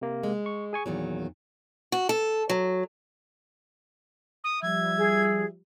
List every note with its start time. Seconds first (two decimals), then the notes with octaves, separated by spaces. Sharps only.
0.01 C3 A#3
0.23 G#3
0.46 C#6
0.73 G#4 G#5 C#6
0.86 E2 A#2 D#3 F#3
1.92 F#4
2.09 A4
2.50 F#3
4.43 D#6
4.62 F3 G3 E5 G#6
4.98 G#4